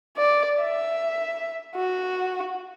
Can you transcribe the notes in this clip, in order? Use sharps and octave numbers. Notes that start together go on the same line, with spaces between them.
D5
E5
F#4